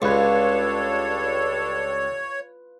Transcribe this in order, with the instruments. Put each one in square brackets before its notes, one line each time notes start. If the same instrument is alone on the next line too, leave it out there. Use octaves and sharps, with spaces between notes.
[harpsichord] C#2 [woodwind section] G3 D4 A4 [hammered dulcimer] F4 B4 [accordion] C#5